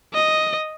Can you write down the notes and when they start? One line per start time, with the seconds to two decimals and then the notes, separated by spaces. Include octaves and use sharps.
0.14 D#5